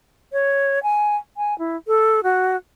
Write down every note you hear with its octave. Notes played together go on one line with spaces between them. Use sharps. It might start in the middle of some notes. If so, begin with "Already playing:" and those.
C#5
G#5
G#5
E4
A4
F#4